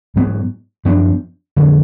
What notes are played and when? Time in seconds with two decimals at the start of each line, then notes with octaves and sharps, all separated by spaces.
0.16 G#2 F#3 B3
0.85 F#2 F3 B3 D4
1.56 F2 D3 F#3